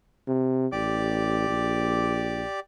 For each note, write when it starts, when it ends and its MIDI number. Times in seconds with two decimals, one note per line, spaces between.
0.28 0.67 48
0.72 1.47 33
0.72 2.60 67
0.72 2.60 74
0.72 2.60 86
1.48 2.43 34